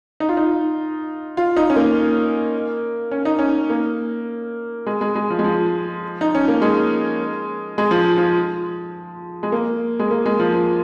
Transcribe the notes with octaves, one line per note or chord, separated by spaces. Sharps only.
D#4
F4
D#4
F4
D#4
C#4
A#3
C#4
D#4
C#4
A#3
G#3
G#3
G#3
F3
G#3
F3
D#4
C#4
A#3
G#3
G#3
F3
F3
G#3
A#3
G#3
A#3
G#3
F3
F3